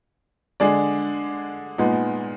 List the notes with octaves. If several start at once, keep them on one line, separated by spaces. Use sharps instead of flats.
D3 G#3 D4 G#4 D5
A#2 G#3 B3 D#4